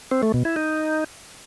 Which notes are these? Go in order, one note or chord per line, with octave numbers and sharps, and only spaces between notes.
C4
A3
B2
E4
D#4